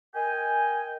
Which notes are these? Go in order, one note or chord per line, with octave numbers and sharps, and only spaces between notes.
A#4 D#5 G5 G#5